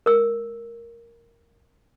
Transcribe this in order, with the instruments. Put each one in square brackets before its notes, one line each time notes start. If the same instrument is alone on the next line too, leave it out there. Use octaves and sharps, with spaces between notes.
[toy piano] A#4 E6